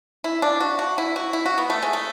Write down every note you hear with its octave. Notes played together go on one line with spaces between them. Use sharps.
E4
D4
F#4
F#4
E4
F#4
E4
F#4
B3
A3
G#3
A3